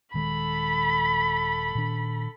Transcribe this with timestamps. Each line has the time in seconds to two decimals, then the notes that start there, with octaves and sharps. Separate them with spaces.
0.14 D#1 D#3 G#3 A4 B5
1.75 A#2 D#3 D4